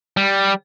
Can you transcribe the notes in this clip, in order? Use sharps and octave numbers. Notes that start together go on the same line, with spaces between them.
G3